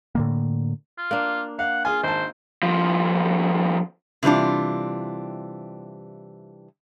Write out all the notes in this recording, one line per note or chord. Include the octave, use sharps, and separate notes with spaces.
A2 D3 A#3
F4
A#3 D4
F5 F#5
F4 G#4 G#5
G#1 C5 A5
D#2 F3
C3 E3 G3 D4 F4